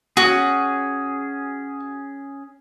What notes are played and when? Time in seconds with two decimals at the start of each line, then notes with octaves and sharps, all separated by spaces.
0.17 C#4 F#4 G#4